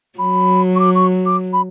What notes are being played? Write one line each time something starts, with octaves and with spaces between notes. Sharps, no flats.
F#3 B5
C#6
D6
C#6
D6
B5